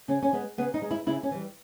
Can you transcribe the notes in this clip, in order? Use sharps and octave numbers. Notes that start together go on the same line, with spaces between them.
C#3 C#4
C#4
G#3 B3
C#3 B3
D#4
G#3
E4
C#3 E4
C#4
E3 G3